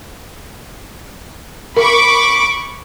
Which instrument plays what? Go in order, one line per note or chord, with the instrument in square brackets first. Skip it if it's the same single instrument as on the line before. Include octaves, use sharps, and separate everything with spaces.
[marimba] A#4 [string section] B5 C#6 D6